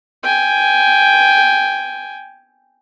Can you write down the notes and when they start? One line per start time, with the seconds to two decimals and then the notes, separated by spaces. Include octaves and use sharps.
0.23 G5 G#5